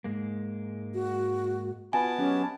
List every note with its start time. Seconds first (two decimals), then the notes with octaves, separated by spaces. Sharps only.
0.04 G#2 G#3 A#3
0.94 F#4
1.93 B3 F4 F#4 D#5 G#5 A5
2.18 F#3 C#4 G4 D#5